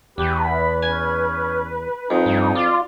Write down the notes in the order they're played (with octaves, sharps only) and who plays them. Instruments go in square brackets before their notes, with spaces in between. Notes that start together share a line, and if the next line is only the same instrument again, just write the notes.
[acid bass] E2 [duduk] G4 [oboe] B4
[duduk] B4 [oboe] B5
[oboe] C#4 [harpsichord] G#5
[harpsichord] F2 [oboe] D#4
[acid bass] G2
[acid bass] F4 [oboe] D5